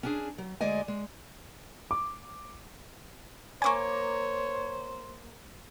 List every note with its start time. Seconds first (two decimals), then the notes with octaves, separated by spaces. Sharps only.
0.03 C#4 D4 G#4
0.38 F#3
0.61 D2 G#3 D5 D#5 G#5
0.88 G#3
1.91 D6
3.62 A#3 C4 C5 C#5 G#5 C#6 D6